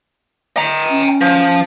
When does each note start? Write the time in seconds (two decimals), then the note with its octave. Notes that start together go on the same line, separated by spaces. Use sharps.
0.57 G5 A#5
0.90 C#4
1.21 F3